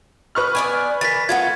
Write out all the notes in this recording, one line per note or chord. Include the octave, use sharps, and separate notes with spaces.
B4 C#6 F6
B3 D5 G#5
E3 A#4 A6 B6
A3 B3 F4 F#4 G#6